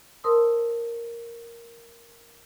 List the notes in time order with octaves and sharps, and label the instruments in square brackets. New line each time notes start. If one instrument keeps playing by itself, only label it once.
[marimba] A#4 C5 A5 C6 D#6 E6